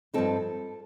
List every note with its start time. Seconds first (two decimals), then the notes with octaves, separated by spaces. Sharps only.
0.14 G2 F3 C4 D#4 A4